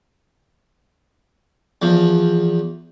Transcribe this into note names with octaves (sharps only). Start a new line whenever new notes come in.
E2 F3